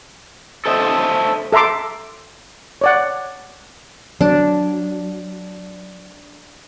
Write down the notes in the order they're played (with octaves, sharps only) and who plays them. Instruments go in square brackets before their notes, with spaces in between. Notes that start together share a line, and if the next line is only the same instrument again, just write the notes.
[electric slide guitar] A4 C5 D#5 E5
[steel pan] A4 E5 A#5 C6 D6
C#5 D5 F#5
[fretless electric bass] F#3 [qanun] D4